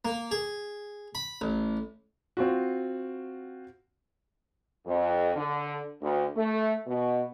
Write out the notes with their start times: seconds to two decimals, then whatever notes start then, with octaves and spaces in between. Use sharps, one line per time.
0.05 A#3
0.31 G#4
1.15 B5
1.41 A1
2.37 C4 F4 F#4
4.86 F2
5.36 D3
6.02 D2
6.36 A3
6.87 B2